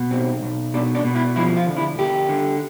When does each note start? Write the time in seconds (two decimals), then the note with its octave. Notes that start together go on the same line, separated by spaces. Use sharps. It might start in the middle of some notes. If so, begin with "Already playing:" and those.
Already playing: B2
0.11 B1 C4
0.43 B1
0.74 B2 D4
0.95 D4
1.05 B2
1.15 E4
1.36 F3 E4
1.57 F4
1.66 D2
1.77 E4
1.98 D2 G4
2.29 D3